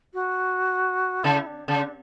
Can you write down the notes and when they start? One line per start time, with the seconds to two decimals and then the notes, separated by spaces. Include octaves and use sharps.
0.14 F#4
1.23 C#3 E4
1.47 D4
1.68 C#3 D4